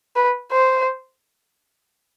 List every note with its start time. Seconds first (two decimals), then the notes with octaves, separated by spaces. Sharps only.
0.16 B4
0.52 C5